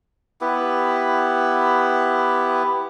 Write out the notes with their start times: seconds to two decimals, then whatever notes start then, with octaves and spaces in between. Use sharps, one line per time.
0.41 B3 E4 G4 B4